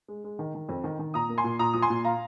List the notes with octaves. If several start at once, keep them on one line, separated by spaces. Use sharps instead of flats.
G#3
G#3
D#3
D#3
F2
D#3
D#3
A#2 A#5 D#6
A#3
G#5 C6
A#2
A#2 A#5 D#6
F3 D#6
G#5 C6
A#2
F5 A#5